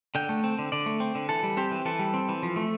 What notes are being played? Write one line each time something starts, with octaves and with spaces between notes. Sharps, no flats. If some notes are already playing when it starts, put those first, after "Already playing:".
D3 G5
A3
C4
D3
D3 D5
A3
C4
D3
E3 A4
G3
C4 G4
E3
E3 A4
G3
C4
E3
F3
A3